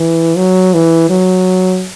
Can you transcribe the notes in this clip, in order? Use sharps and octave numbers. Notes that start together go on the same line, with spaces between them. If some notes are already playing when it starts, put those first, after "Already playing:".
Already playing: E3
F#3
E3
F#3